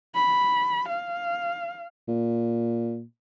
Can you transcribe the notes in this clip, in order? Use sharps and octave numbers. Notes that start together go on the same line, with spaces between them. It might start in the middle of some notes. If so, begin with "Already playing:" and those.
B5
F5
A#2